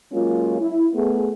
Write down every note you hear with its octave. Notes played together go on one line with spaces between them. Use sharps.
F#3 G#3 A#3 C#4 F4
E4
A3 B3 G#4